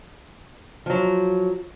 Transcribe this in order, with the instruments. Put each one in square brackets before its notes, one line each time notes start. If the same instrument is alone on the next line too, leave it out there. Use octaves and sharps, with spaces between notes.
[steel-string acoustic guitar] F3 F#3